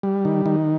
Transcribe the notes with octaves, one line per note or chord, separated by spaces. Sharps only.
G3
D#3
D#3